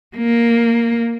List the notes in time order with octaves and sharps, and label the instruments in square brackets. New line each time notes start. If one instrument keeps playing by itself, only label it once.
[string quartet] A#3